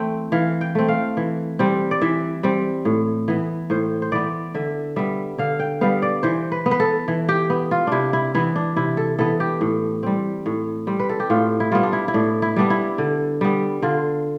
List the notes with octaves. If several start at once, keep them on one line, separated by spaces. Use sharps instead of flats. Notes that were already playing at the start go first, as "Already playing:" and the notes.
Already playing: E3 A3 C4 G5
E3 F5
G5
A3 C4
F5
E3
G3 C4
D5
E3 E5
G3 C4
A2
E3 B3
A2 C5
C5
E3 B3 D5
D3 E5
G3 B3 E5
D3 F5
G5
G3 B3 F5
D5
E3 C5
B4
B3
B4
A4
E3
G4
B3
F4
C3 D4 E4
E4
E3 B3 E4
D4
C3 E4
A4
E3 B3 A4
G4
A2
G3 C4
A2
G3 C4
B4
A4
G4
A2 F4
E4
G3 B3 F4
D4
E4
E4
A2 D4
E4
G3 B3 D4
E4
D3
G3 B3
D3 F4